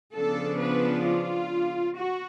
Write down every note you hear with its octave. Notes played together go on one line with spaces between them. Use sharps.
C#3 F3 B3 D4 A4
B4
F4
F#4